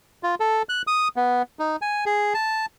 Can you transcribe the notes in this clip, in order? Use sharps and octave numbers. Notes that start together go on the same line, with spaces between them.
F4
A4
F#6
D#6
B3
D#4
G#5
G#4
A5